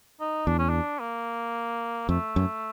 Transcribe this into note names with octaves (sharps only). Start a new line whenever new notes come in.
D#4
E2 D4
C#4
D4
A#3
F2 A3
F#2